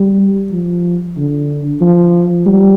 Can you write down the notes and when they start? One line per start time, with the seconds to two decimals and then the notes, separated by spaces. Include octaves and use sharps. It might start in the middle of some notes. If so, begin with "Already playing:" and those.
Already playing: G3
0.52 F3
1.17 D3
1.81 F3
2.46 G3